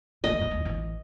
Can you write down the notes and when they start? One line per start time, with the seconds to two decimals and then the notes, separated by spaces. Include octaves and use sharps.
0.24 E3 A3 D#5
0.39 E2 F#3
0.51 D2
0.65 A1 E3